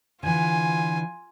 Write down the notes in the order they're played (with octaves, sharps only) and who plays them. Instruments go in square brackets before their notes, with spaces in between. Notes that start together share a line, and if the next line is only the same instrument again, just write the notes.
[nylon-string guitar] D3 E3 [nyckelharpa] F4 G#5